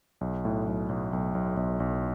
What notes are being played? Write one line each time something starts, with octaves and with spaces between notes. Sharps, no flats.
B1
A2
B1
B1
B1
B1
B1
B1